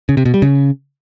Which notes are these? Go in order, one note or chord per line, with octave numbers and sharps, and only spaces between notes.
C#3
C3
B2
G3
C#3